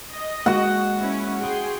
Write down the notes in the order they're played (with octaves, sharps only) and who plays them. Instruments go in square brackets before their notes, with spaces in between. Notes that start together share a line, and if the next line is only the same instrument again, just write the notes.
[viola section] D#5
[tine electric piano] G#3 A#3 [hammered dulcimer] F#4 F#5
[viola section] C#4 E4
G#4 G5 C6